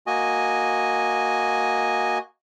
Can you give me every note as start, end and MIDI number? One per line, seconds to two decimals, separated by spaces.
0.07 2.18 58
0.07 2.18 66
0.07 2.18 75
0.07 2.18 80